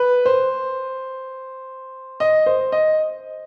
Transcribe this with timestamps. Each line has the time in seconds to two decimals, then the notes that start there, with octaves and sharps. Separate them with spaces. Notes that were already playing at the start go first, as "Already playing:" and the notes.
Already playing: B4
0.26 C5
2.20 D#5
2.46 C5
2.72 D#5